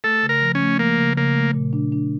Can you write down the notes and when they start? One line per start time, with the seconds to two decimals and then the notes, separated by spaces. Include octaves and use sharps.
0.04 A3 A4
0.23 C#3
0.29 A#4
0.42 F3
0.55 C#4
0.61 A3
0.79 F3 A#3
0.98 C#3
1.17 C#3 A#3
1.36 A3
1.54 A#2
1.73 D4
1.92 D4